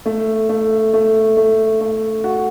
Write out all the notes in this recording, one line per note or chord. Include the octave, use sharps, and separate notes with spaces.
A3
A3
A3
A3
A3
F#4